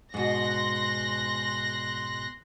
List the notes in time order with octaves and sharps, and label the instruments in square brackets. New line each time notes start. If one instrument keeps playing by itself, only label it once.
[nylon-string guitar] G#2 B2 [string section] C6 F#6 A#6